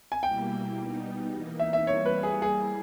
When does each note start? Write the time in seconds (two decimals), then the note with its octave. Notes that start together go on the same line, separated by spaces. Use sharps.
0.12 G#5
0.23 B2 G3 A#3 E4 G5
0.77 B2 G3 B3 D#4
1.33 E3 A#3 D#4
1.59 E5
1.73 E5
1.87 E3 G3 A#3 C#5
2.06 B4
2.23 G#4
2.42 G3 A#3 E4 G#4